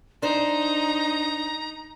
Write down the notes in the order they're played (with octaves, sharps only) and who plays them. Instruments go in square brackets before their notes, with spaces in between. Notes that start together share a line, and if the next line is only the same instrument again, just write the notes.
[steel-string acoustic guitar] D4 C5 [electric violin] D#4 [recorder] A#5